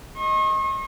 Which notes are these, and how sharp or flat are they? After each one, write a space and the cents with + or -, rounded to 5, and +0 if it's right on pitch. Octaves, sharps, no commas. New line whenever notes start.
D#5 +0 C#6 -45